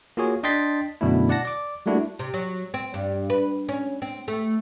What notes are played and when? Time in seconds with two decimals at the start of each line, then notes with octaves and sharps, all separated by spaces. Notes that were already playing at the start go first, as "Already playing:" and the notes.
0.17 A#3 F4 F#4 G#4 C#5
0.43 D4 D#5 G5 C6 A6 B6
1.01 F#2 B2 D3 A3 D4 E4
1.29 D5 F#5 A5 A#6
1.45 D5 D6
1.86 G3 A3 A#3 D4 E4 F#4
2.19 C3
2.34 F#3
2.74 C4
2.94 G2
3.30 B4
3.69 C#4
4.02 C4
4.28 A3